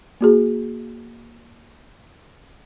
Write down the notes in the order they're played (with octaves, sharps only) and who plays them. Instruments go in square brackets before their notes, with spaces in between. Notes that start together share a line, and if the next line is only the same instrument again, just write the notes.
[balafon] A#3 F#4 G#4